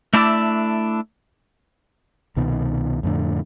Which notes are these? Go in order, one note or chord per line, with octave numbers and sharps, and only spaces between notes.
A3 D4 E4 D5 E5
C2 B2 D#3
F2 A2 D3